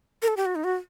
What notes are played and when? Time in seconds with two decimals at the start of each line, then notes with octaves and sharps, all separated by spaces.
0.22 A#4
0.28 A4
0.37 G4
0.46 F#4
0.55 D#4
0.64 F#4